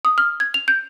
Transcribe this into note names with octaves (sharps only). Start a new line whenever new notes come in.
D#6
F6
G#6
F7
G6